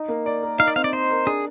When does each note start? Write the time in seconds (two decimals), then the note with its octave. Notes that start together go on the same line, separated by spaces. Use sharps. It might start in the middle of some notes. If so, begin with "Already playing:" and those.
Already playing: D#4
0.09 A#3
0.26 D5
0.43 A#4
0.59 D#4 F5
0.68 D5
0.76 C4 F5
0.84 D5
0.93 C5 D#5
1.10 A#4
1.26 D4 G#4